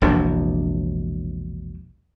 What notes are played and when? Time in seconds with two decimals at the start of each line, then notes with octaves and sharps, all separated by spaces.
0.02 E1 A#1 C3 D4